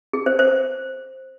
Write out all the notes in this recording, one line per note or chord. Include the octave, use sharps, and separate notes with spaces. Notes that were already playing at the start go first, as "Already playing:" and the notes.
G#4
C5
C5